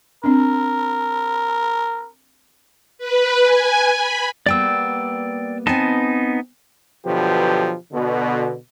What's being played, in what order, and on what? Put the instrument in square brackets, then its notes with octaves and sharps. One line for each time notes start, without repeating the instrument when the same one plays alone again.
[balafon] C4 D4 [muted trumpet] A#4
[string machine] B4
G#5
B5
[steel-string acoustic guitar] G3 A#3 B3 [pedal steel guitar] D5 G5 E6
[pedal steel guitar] B3 D#4 A5 [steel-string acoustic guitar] C4 G#5
[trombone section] B2 D3 F3 F#3 G4 B4
B2 D3